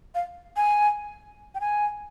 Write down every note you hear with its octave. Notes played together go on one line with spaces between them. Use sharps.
F5
G#5
G5
G#5